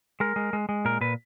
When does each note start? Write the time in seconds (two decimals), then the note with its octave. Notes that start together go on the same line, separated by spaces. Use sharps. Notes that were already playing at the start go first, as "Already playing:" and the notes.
0.20 G#3 A#4
0.36 G#3
0.53 G#3
0.69 G#3
0.85 A#2 A#4
1.01 A#2 B4